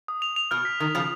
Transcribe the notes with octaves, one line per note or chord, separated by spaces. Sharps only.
D#6
F7
F7
B2 F6
B6
D#3 F6
C#3 F3 F6